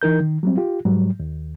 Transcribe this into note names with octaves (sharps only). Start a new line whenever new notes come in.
E3 D#4 A#4 G6
D#3
F#3 G3 C4
F4 G4
G#2 F#3 G3
D#2